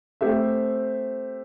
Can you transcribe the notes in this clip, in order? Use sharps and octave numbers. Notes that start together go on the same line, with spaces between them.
A3 C4 G4 C5 E5